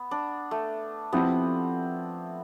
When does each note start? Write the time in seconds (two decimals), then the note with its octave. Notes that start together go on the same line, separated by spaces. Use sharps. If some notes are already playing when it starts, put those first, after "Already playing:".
Already playing: B3
0.11 D4
0.51 A3
1.13 F3 B3 C4 E4 G4